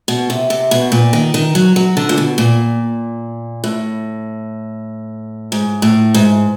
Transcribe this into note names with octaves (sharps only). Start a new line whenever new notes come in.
B2
C3
C3
B2
A#2
D#3
D#3
F#3
F#3
D3
A#2
B2
A#2
A2
G#2
A2
G#2